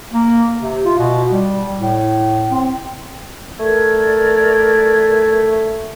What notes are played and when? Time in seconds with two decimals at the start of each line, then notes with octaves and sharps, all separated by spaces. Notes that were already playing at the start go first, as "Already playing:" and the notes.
0.12 A#3
0.60 C3
0.85 F4
0.99 B2
1.31 G3
1.79 A2
2.51 C4
3.60 A3 A#4 D5 G#6